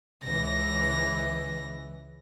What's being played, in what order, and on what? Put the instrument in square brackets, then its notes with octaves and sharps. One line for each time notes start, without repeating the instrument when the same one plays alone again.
[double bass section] C#2 E3 [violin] A#6